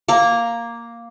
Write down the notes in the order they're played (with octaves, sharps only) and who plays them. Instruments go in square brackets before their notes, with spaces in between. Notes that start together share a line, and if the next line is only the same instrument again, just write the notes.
[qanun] A#3 A#5